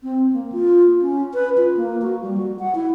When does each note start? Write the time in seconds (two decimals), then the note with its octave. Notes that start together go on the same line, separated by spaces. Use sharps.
0.03 C4
0.33 A#3
0.52 F4
1.01 C#4
1.34 B4
1.58 F4
1.77 A#3
2.02 F#4
2.22 G3
2.37 F#4
2.59 F#5
2.75 E4